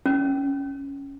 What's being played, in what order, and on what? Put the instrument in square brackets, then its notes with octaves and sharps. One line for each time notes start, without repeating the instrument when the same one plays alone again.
[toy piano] C#4